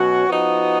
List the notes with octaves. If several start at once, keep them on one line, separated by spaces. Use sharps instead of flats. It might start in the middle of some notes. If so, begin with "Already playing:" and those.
Already playing: B2 F#3 C#4 F#4
F3 B3 D#4 F#4